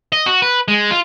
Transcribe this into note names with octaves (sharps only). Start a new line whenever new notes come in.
D#5
F#4
B4
G#3
F4